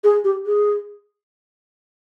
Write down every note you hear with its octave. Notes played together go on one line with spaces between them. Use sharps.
G#4
G4
G#4